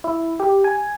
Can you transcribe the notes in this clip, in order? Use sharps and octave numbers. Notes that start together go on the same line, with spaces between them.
E4
G4
G#5